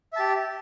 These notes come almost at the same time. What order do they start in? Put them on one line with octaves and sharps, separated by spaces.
E5 A5 G4